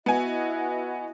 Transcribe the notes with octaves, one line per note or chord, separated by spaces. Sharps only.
B3 E4 F#4 D#5 G#5